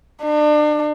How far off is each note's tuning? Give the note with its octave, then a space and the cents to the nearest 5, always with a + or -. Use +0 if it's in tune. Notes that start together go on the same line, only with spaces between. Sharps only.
D4 +35